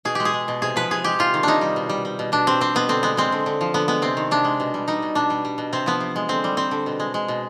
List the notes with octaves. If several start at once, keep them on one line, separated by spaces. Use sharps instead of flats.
B2 G#4
G#3 G4
G#4
G#3
B2
C3 G#4
F3 B4
C3 G#4
G#3 G4
C3 F4
D#3
C3 D4 D#4
G3
B2
G3
G3
B2
B2 D4
G3 C4
G3 C4
B2 B3
D3 C4
G#3 B3
G#3 C4
D3
D3
F3
D3 B3
G#3 B3
C3 C4
D#3
C3 D4
G#3
B2
G3
G3 D#4
B2
B2 D4
G3
G3
B2
C3 C4
F3 B3
C3
G#3
D3 C4
G3
G3 C4
D3
B2
G#3
G#3
B2